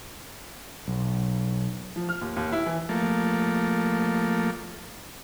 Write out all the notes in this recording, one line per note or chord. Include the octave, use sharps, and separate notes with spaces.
B1
F3
F6
D#2
D#2
E4
E3
F3 A3 A#3